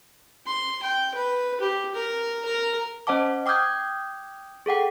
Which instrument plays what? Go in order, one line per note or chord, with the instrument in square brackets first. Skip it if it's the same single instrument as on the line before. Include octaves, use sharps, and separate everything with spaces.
[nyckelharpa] C6
G5
B4
G4
A#4
A#4
[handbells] C#4 C5 D#5 F#5 A5 D6
G5 D6 D#6 F6 G6 G#6
G#4 A4 F#5 G5